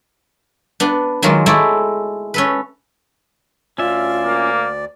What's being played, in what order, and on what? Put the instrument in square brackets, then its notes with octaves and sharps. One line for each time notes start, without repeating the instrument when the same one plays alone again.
[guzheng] B3 D4
D#3 F#3 G#3 A#3 F4
G#3 A3 E4 D5
C#4 A4 B4
[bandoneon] D2 D5 [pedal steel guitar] C#4 E5 [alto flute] F4
[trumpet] A#3